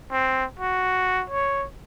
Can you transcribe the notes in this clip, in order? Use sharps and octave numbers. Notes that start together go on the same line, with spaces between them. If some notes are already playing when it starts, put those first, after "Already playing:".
C4
F#4
C#5